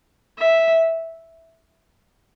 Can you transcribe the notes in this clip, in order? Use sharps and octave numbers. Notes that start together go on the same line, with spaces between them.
E5